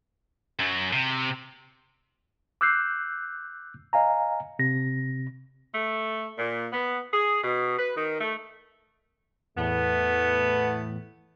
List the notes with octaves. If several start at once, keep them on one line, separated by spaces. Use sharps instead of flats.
F#2 F#3
C3
D6 E6 F#6 G6 C7
D#5 F5 G#5 A#5
C3 A#6
A3
A#2
B3
G#4
B2
B4
D#3
A3
E2 A2 A3 B3